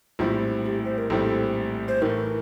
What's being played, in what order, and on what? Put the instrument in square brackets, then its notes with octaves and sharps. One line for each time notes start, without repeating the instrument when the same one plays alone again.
[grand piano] A#1 A2 G3 C4 E4 [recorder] F4
[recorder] G4
C5
A#4
[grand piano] A#1 A2 G3 C4 E4 [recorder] A4
[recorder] C5
[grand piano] A2 E3 A3 [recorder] A#4